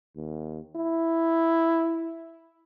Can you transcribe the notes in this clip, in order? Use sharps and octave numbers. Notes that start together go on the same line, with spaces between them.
D#2
E4